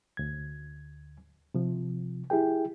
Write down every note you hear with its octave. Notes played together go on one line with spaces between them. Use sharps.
D2 G#6
C3 F3
E4 G4 G#4 G5